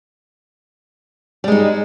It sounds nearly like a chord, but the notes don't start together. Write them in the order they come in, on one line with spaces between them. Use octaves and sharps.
G3 G#3 D#4